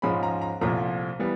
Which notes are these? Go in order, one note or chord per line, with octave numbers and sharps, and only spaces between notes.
G#2 F3 G#3 C#4 B5
A#5
A#5
C2 A#2 F3 A3 A#5
E3 G3 B3